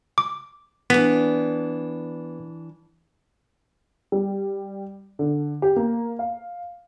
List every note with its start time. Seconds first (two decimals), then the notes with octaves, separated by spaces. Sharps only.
0.18 D6
0.90 E3 B3 D4
4.12 G3
5.19 D3
5.62 G4
5.76 A#3
6.19 F5